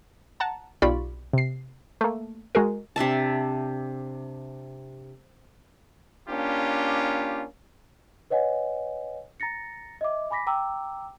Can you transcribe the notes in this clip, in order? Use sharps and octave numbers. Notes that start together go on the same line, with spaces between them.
F#5 A5 A#5
B1 F4 G4 D5 B5 C#6
C3 C7
A3 A#3
G#3 F#4 G#4 A#4
C3 D4 E5 A5
A#3 C#4 D4 F4 G4
B4 C#5 D#5 F#5 G#5
A#5 A6 A#6 C#7
D#5 E5 D6
G#5 B5 D6 A#6 B6
G5 A#5 D6 E6